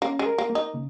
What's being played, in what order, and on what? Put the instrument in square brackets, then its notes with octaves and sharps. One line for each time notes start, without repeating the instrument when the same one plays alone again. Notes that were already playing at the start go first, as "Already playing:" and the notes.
[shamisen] A#3 [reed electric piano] C#4
[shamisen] G#3
[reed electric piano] A#4
[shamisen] A#3
[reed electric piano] A#3
[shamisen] D#4
[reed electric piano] C#3